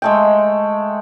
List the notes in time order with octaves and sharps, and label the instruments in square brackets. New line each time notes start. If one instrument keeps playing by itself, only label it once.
[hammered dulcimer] G#3 A3 G5